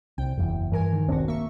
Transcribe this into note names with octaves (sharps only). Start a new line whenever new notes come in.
C2 G5
F#1 E2
G2 E3 A#4 G#5
D#3
E1 A#1 C4 D4 F#4
A#3 E5 C#6